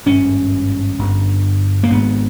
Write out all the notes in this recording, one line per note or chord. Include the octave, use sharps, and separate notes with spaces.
G#1 G2 C#4
G1 G2
A#3
G#1 G#2 B3